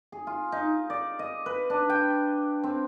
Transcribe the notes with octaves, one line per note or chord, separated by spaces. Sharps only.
G#4
F4
D#4
D5
D#5
B4
D4
G5
C4